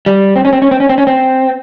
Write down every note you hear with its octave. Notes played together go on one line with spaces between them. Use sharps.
G3
C4
C#4
C4
C#4
C4
C#4
C4
C#4
C4